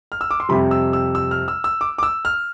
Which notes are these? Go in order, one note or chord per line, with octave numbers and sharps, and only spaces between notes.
F6
E6
D6
C6
F2 C3 G3 B5
E6
E6
E6
F6
E6
E6
D6
D6
E6
F6